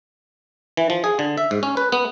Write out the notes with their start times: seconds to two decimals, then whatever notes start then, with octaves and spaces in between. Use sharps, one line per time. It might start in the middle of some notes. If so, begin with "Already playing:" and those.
0.77 E3
0.90 F3
1.04 G#4
1.19 D3
1.38 E5
1.51 G#2
1.63 C#4
1.77 B4
1.92 B3